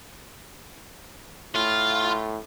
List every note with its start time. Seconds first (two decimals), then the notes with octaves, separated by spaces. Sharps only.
1.55 A2 F4